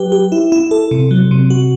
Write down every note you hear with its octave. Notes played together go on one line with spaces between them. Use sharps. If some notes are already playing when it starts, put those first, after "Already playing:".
Already playing: F#3 G4 B4
G4
E4
E4
A4
C3
F#3
C3
F#4